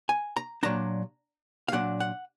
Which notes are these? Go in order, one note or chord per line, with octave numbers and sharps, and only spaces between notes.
G#5
A#5
A#2 F#3 D4 A#5
F5
A#2 F#3 D4 F#5
F#5